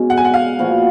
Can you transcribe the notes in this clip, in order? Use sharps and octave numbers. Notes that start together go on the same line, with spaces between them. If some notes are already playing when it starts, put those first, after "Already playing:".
Already playing: B2 G#3 C#4
F#5
G#5
F#5
F5
A#2 F3 B3 F#4